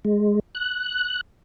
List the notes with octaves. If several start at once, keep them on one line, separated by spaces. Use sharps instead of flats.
G#3
F#6